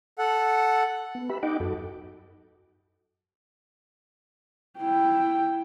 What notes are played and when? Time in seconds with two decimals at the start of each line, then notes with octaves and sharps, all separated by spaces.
0.18 A4 F#5
1.15 B3
1.29 G4 B4 E5 B5
1.43 D#4 D#5 F#5 G5 D6
1.60 F#2 F#4 A4
4.80 E4 G5